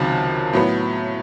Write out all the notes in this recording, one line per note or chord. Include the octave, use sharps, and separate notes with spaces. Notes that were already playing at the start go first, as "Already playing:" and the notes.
Already playing: C#2 C3 D#3 F#3 A5
A2 F#3 B3